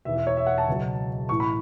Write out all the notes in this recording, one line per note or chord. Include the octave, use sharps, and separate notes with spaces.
E1 E2 E3 E5
E5
C#5
E5
F#5
A5
C#2 B2 F#3
A1 A2 E3 C#6
B5